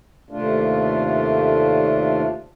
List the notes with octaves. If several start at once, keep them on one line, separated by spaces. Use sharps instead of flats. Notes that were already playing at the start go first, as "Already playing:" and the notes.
D#2 C3 A3 D4 F4